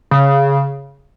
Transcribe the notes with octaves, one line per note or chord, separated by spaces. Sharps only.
C#3